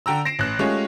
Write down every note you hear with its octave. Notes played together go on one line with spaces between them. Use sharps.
D3 G5 A#5 E6
A#6 C7 D7 E7
A1 F#6
G#3 A3 C#4 F4 G4 C#5